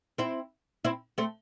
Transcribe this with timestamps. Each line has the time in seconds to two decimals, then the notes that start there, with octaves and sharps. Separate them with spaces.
0.18 C4 E4
0.85 C4 E4
1.18 A3 C4